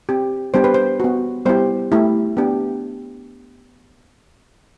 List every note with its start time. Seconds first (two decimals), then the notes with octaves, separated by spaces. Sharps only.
0.09 C4 G4
0.54 G3 B3 D4 G4 C5
0.64 B4
0.74 C5
1.00 B3 F#4
1.45 G3 B3 E4 G4 C5
1.92 A3 E4 G4
2.37 B3 D4 G4